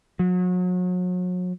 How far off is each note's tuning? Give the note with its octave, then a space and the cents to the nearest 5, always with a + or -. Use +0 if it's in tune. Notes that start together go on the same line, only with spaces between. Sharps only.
F#3 -35